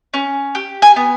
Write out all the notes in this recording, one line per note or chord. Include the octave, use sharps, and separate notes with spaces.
C#4
G4
G#5
B3